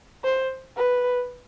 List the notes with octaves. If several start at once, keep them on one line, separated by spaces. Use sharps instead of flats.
C5
B4